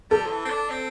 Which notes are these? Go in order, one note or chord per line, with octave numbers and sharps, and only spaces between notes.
G3 A4
F3
E3
C4
D4
C4